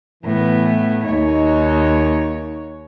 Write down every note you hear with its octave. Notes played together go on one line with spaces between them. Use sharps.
A2 E3 B3
D#2 D#4 C#5